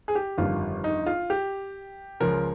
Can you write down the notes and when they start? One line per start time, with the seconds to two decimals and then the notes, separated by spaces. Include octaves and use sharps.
0.08 G#4
0.15 G4
0.38 G1 F2 D#3 G3 F4
0.84 D#4
1.06 F4
1.30 G4
2.20 C#2 C#3 F3 A#4